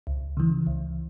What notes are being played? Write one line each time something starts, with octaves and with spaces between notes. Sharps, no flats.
C#2
C#3 E3
C#2